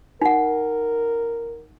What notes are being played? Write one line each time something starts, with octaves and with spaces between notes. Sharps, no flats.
D#4 A#4 F#5